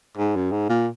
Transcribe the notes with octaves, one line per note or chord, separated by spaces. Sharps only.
G#2
F#2
G#2
A#2